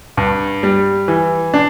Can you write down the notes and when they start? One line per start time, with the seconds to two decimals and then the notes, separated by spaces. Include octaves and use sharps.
0.17 G2
0.63 G3
1.08 E3
1.54 D4